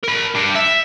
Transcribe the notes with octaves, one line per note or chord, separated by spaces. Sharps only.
A#4 B5
D4 G4
E5